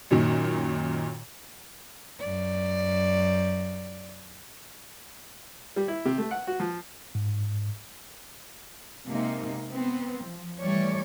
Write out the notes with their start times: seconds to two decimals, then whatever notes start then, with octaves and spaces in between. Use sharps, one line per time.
0.11 F#2 A#2 D#3
2.20 F#2 D5
5.76 G3
5.88 E4
6.05 C3
6.18 A3
6.31 F#5
6.47 F#4
6.60 F3
7.15 G#2
9.08 C3 G#3 A#3 D#4
9.70 B3 C4
10.24 F3
10.62 E3 G3 A3 C#5 D5